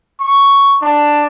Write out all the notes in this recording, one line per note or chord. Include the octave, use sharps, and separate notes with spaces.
C#6
D4